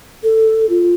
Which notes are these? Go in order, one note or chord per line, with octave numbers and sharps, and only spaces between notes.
A4
F4